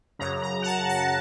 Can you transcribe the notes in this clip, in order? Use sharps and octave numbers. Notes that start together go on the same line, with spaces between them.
F#2 C#3 A#5
A#5
F#5
A5
A5